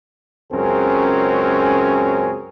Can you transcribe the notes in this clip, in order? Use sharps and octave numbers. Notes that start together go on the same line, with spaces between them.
C#2 F#2 C4 C#4 G#4 A#4